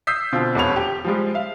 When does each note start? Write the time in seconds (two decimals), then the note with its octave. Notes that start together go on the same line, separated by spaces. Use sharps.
0.07 D#6 E6 G6 B6 C7
0.32 B2 D3 C4 F4
0.55 D#1 E2 B3 C#5 F7
0.76 G4
1.05 F3 G3 G#3
1.34 E5 F5